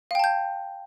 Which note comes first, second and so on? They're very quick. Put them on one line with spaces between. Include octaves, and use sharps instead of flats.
F5 G5 A5 G6